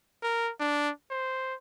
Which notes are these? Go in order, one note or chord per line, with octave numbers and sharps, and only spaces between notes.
A#4
D4
C5